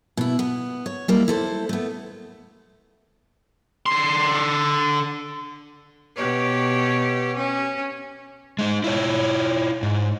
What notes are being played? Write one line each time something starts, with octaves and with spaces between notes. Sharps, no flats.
B2 E4
B3
C#5
G3 A#3 E4
E4 A4 C5
A3 B3
D3 C6
B2 G4 C#5
C#4
G#3 D#4
E4 F4 C#5
G#2